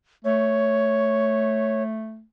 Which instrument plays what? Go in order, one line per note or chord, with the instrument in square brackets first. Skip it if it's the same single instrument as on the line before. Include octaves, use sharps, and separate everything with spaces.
[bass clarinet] A3 [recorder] C#5